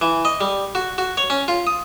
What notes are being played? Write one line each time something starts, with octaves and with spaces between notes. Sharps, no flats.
E3
D#5
G3
F#4
F#4
C#5
C#4
F4
D#6